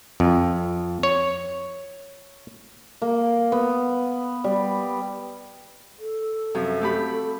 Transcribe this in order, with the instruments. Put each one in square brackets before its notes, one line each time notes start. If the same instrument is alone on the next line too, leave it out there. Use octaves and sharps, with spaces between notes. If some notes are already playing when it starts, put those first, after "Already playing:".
[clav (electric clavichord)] F2
C#5
[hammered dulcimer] A#3
B3
G3
[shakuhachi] A4
[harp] F#2 C3 F3
A3 G4 B5